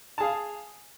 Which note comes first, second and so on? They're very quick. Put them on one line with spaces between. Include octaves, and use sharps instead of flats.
A5 G#4 F5